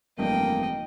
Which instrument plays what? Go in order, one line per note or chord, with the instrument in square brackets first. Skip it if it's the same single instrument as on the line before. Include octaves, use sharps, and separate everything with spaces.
[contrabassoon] F1 [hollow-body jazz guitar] E2 G2 [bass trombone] A#3 [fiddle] D#5 G5